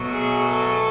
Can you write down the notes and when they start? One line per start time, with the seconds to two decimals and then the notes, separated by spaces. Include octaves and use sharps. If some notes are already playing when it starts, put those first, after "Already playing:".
Already playing: B2 F#3 A3
0.13 G#4
0.48 A4